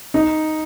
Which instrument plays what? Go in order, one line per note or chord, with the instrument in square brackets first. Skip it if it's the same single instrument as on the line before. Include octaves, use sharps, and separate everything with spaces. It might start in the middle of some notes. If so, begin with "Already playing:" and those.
[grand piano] D#4